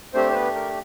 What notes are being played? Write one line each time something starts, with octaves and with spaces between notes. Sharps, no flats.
A3 C4 D4 G4 C5
C5
B3 B4
A#4